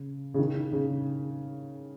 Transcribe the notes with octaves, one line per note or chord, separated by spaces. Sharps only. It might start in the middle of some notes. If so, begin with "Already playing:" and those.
Already playing: C#3
C#3
D#3
D#3
C#3